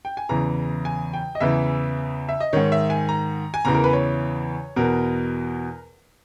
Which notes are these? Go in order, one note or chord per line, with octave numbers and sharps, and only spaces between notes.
G5
G#5
E2 C#3 E3 A#5
G#5
G5
D#5
E2 C#3 E3 E5
E5
D#5
G#2 D#3 C#5
E5
G#5
A#5
G#5
E2 C#3 E3 A#5
A#4
B4
C#5
E2 B2 A#4